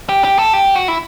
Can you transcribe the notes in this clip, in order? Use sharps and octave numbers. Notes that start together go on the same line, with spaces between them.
G4
G4
A4
G4
F#4
E4